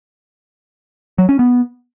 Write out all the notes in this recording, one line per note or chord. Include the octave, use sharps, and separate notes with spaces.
F#3
C#4
B3